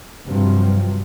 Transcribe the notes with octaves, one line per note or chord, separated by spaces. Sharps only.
G2 C3 F3 F#3